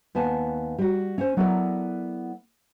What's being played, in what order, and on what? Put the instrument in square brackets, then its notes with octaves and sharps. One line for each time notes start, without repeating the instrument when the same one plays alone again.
[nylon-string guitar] D#2 B3 G#5 A5
G3 F#4
C#4 C5
F#3 B3 E4 A4 A#4 D5